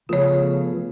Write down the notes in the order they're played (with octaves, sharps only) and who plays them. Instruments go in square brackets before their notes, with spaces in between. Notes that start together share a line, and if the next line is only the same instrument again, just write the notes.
[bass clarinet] C#3 [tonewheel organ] F3 A3 B3 [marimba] F4 C#5